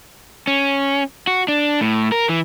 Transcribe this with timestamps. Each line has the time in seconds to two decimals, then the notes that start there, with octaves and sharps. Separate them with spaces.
0.47 C#4
1.27 F#4
1.48 D4
1.81 A2
2.12 A#4
2.29 E3